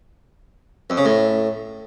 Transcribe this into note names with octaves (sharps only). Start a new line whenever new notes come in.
F2
C#3
A2